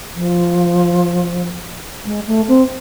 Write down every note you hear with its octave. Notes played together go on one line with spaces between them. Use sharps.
F3
G#3
A3
C4